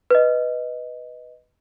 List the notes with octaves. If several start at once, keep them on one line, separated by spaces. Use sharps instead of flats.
B4 D#5